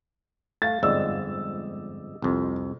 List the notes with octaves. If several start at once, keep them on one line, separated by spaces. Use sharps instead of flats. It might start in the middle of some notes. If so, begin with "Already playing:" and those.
A3 F5 A6
G1 F2 G#2 D5 D#5 E6
C2 F2